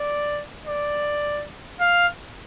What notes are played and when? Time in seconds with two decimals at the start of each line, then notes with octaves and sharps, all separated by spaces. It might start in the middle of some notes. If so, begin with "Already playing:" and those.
Already playing: D5
0.66 D5
1.80 F5